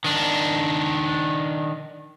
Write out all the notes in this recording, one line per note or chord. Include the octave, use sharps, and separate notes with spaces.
D#3 D4